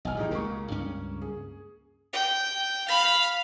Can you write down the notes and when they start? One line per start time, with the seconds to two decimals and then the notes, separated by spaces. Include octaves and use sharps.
0.05 E1 B1 D#5 G#5 F6
0.17 A2 D#3 D#4 G4 G#4
0.31 C#2 F#2 C#3 A#3 C#6
0.71 C#2 G2 C#4
1.22 G#4
2.13 G5
2.88 F5 B5